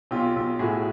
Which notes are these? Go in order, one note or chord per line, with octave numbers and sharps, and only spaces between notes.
B1 F4 G4
B1
A2 F#4 G#4